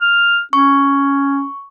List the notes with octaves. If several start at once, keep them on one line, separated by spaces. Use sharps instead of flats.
F6
C#4 C#6